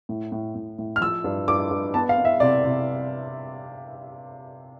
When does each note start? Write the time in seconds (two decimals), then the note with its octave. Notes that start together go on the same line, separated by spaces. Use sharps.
0.09 A2
0.32 A2
0.55 A2
0.79 A2
0.96 F6
1.01 F3 E6
1.24 G2
1.48 G2 D6
1.71 G2
1.94 B3 A5
2.09 F5
2.18 B3
2.25 E5
2.40 C3 D5
2.64 C3